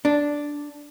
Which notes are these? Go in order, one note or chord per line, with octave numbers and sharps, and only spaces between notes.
D4